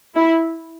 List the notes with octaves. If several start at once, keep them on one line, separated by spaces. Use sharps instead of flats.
E4